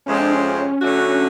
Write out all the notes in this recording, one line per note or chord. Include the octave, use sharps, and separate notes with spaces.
F2 C3 F3 G#3 C4 C#4
D4
C#4
D3 F#3 A3 D4 F#4